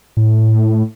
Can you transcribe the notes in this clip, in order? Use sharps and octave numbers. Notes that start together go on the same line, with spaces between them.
A2